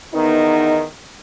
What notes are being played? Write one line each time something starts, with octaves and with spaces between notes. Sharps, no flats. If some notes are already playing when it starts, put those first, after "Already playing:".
E2 D#3 B3 D#4